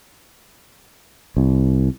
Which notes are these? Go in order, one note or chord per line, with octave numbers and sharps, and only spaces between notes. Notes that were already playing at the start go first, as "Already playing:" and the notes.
C2